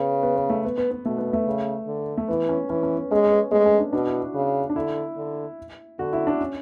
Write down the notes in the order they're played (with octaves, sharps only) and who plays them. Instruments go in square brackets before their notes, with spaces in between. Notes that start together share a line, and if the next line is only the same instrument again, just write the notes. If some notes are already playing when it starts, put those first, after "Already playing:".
Already playing: [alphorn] C#3 [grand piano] B3
[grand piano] B3
B3
A3
B3
B3
B3
[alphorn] B2 [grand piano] A3
[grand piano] B3
A3
[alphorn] C#3
D3
[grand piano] A3
[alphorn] E3 [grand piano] B3
[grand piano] C#4
[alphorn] E3 [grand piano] C#4
[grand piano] C#4
B3
[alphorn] G#3 [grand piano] C#4
[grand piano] C#4
B3
[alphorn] G#3 [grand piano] A3
[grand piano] C#4
D4
[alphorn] B2 [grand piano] D4
[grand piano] E4
F#4
[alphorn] C#3
[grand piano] D4
[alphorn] D3 [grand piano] E4
[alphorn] D3
[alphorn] D3 [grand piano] F#4
[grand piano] E4
D4
C#4